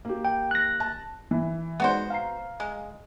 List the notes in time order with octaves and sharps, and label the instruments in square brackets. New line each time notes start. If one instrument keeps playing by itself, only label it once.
[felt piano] A#3 G4
[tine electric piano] G5
F#6 A#6
[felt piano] A5
E3
[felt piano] G#3 D#4 D5 [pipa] B3 F#4 C5
[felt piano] F5 A#5 C7
[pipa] G#3